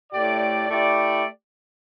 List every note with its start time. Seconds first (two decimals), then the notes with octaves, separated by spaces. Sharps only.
0.12 A2 A3 G4 D5
0.68 A3 E4 G4 D5